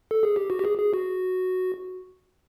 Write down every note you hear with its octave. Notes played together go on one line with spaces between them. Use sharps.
A4
G#4
G4
F#4
G4
G#4
G#4
F#4